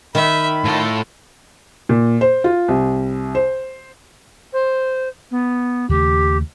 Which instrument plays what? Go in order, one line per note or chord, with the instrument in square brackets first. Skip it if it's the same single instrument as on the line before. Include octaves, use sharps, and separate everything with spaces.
[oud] D#3 [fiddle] E5 [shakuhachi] B5
[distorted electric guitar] A2 A4 [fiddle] F4
[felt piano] A#2
C5
F4
C2
C5
[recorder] C5
B3
[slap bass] D#2 C#3 A3 [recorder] G4